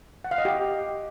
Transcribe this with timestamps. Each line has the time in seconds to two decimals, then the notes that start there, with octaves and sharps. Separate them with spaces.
0.24 F#5
0.31 F5
0.38 D#5
0.45 G4
0.52 D#5